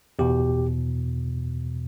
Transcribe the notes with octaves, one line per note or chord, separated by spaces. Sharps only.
E2 B2 G4